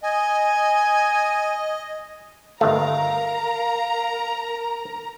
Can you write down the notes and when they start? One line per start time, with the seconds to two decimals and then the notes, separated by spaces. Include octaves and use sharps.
0.03 D#5 G#5
2.61 G1 D#3 A3 A#4 F5 A#5